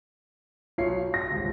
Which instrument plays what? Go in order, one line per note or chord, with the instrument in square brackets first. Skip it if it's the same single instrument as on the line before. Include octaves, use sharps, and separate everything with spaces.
[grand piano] B1 C#5 C7 [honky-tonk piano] F4
[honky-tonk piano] A#6
[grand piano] D#1 G#1 C#2